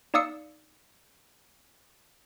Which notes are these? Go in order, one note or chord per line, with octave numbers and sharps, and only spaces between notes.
D#4 D5 F5 D#6 E6 C#7